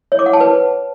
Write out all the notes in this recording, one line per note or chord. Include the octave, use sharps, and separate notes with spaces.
C#5
D6
F#5
A5
B4